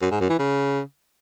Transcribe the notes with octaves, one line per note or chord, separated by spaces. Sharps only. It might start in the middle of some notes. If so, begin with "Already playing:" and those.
F#2
G#2
F#2
E3
C#3